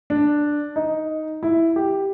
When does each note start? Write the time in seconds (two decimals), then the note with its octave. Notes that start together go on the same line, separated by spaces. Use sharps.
0.10 D4
0.76 D#4
1.43 E4
1.76 G4